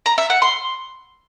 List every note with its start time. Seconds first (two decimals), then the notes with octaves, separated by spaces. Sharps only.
0.06 A#5
0.18 E5
0.30 F#5
0.42 C6